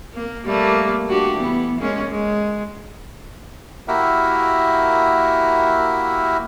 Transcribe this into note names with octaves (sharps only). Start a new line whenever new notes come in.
A#3
G3 A3 A#3
D4 F#4 G4
E3 B3
G#3 A#3 C#4
G#3
A#3 E4 F#4 G4 A#4 E5